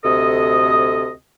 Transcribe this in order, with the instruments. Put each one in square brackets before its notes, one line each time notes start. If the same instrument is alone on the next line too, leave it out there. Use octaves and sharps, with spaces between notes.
[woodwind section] D2 C3 A4 D#5 D#6